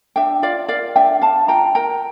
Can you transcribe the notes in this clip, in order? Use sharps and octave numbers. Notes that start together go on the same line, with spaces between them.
D4 E5 G5
F4 D5 F5
A#4 D5 F5
D4 E5 G5
D4 F5 A5
F4 G5 A#5
A#4 G5 A#5